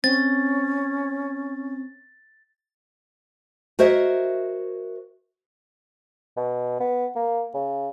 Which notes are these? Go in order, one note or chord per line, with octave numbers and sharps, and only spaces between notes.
C4 C#4 A6
F#4 A#4 C5 C#5 D#5 E5
B2
B3
A#3
C#3